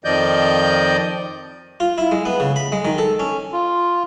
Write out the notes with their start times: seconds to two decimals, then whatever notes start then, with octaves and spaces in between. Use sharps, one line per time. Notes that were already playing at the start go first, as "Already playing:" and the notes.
0.04 F2 D#3 F3 D5 D#5 G6
1.80 F4
1.98 E4
2.12 G#3
2.25 B3
2.40 C#3
2.56 B5
2.72 G#3
2.85 D#3
2.98 A4
3.20 C#4
3.52 F4